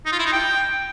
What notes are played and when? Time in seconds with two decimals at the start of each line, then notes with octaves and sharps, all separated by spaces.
0.06 D#4
0.12 F4
0.19 E4
0.26 D#4
0.33 G5